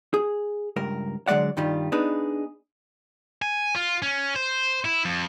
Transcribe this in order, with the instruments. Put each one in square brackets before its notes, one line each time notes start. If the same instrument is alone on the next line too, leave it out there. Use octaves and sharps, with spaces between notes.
[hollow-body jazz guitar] G#4
C#2 G2 A#4
D3 F#3 G#3 D5 F#5
G2 D#3 G3 F4
B3 D4 D#4 G#4 B4
[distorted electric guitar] G#5
F4
C#4
C5
E4
F2